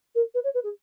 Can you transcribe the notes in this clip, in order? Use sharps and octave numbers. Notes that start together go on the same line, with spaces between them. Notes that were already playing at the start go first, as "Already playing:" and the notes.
A#4
B4
C#5
B4
G#4